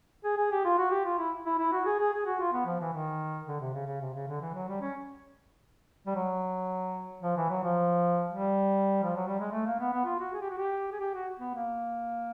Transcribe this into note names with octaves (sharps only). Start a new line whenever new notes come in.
G#4
G#4
G4
F4
F#4
G4
F4
E4
E4
E4
F#4
G#4
G#4
G#4
F#4
F4
B3
F3
E3
D#3
D3
C3
C#3
C#3
C3
C#3
D3
E3
F#3
G3
C#4
G3
F#3
F3
E3
F#3
F3
G3
F3
F#3
G3
G#3
A3
A#3
B3
B3
F4
F#4
G#4
G4
F#4
G4
G#4
G4
F#4
B3
A#3